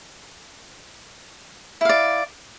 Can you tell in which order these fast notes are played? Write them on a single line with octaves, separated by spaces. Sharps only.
E4 F5 D5